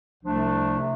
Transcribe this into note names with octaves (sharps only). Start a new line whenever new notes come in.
C2 C3 F3 A3 D4
C3